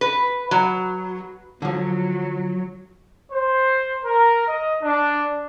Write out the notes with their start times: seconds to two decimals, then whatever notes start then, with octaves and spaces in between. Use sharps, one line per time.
0.01 B4
0.51 F#3
1.62 D3 F3 F#3
3.30 C5
4.05 A#4
4.48 D#5
4.82 D4